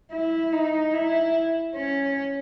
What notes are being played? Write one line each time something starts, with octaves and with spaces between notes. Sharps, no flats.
E4
D#4
E4
C#4